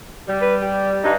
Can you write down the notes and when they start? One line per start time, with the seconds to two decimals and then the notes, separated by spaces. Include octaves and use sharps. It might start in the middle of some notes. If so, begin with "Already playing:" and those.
0.28 G3
0.42 B4
0.62 G4
1.03 G2 D#4